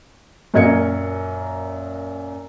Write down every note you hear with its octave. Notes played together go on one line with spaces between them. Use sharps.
F#2 A#2 A#4 D#5 G#6 C#7